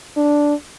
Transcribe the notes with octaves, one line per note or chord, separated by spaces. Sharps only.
D4